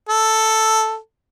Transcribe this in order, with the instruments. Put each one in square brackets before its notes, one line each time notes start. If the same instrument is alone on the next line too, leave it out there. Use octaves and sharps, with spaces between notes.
[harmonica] A4